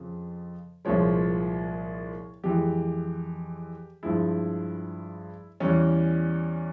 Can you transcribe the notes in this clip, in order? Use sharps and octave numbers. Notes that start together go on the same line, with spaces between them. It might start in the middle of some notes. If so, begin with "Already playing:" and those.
Already playing: F2 C#3 F3
C2 A#2 F3 G#3 C#5
F2 E3 G#3 G4
G2 F3 G#3 E4
E2 E3 G3 C#4